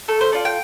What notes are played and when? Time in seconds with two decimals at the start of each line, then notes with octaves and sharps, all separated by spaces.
0.08 A3 A4
0.21 C5
0.32 F4 A4 D5
0.45 G5